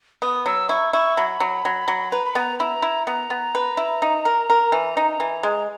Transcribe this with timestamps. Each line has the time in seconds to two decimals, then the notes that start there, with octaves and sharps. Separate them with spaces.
0.22 B3 D#6
0.46 F#3 E6
0.69 E4 C#6
0.93 E4 C#6
1.17 F#3 B5
1.40 F#3
1.65 F#3
1.88 F#3
2.11 B4 A#5
2.26 B5
2.35 B3 A#5
2.59 E4 A#5 B5
2.82 E4
3.07 B3 A#5
3.30 B3
3.55 B4
3.77 E4
4.02 D#4
4.25 A#4
4.50 A#4
4.72 E3
4.97 D#4
5.20 E3
5.43 G#3